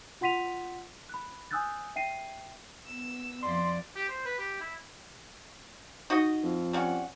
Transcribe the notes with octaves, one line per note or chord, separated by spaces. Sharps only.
F4 F#5 C6 B6 D#7 F7
B5 F#6
G#5 D#6 E6 F#6 G6 A6
E5 G5 C7 D#7
B3 E6
F2 E4 D5 C6
G4
C5
B4
G4
E4
D#4 F#4 D#5
F2
G3 C#4 F#5